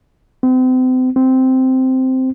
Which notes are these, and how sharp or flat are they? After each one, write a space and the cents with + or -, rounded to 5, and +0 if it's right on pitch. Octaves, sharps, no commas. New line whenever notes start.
C4 -35
C4 -5